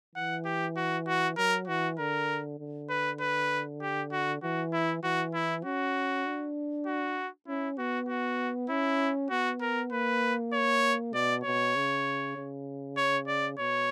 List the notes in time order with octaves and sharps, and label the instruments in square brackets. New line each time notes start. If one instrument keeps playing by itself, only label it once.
[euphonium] E3 [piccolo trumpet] F#5
[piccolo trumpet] G4
F#4
F#4
[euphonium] F#3 [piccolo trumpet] A#4
[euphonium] E3 [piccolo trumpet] F#4
[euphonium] D3 [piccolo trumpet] A#4
[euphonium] D3
[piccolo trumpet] B4
B4
G4
F#4
[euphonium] E3 [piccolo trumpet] F#4
[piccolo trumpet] E4
[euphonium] E3 [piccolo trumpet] F#4
[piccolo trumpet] E4
[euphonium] C#4 [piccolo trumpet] F#4
[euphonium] D4
[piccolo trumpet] F#4
[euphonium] C#4 [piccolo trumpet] E4
[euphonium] B3 [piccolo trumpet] F#4
[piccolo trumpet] F#4
[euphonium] C#4 [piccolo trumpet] E4
[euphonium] B3 [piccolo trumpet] F#4
[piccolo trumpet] A#4
[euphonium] A#3 [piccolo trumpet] B4
[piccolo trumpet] C#5
[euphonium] B2 [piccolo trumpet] D5
[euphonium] B2 [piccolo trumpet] C#5
[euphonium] C#3
C#3
[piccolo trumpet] C#5
D5
[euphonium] B2 [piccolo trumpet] C#5